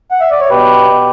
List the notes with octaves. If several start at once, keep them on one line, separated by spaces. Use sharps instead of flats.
F#5
E5
D5
C#5
B2 G4 B4
B2